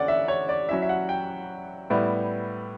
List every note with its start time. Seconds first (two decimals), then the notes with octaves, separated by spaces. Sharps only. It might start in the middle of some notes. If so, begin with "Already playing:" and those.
Already playing: D3 C#4 D5 F#5
0.08 E5
0.28 C#5
0.49 D5
0.68 F#3 C#4 E4 E5
0.82 E5
0.89 F#5
1.09 G5
1.90 A2 G3 B3 E4